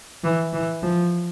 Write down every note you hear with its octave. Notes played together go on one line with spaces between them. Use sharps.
E3
E3
F3